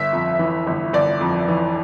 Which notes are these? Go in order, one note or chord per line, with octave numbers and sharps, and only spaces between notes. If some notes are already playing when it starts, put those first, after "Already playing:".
Already playing: G1 E5
F2
E3
G1
G1 D5
F2
E3